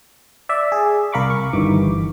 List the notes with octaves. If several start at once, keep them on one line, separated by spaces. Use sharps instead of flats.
D5 E5
G#4
C2 A#4 F5 B5 C#6 D6
C#6
G1 G2 D#3 E3 D6